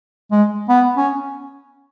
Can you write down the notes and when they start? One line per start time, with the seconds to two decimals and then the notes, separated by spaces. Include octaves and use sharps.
0.31 G#3
0.69 B3
0.97 C#4